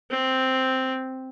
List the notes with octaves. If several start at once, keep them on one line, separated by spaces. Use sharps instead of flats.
C4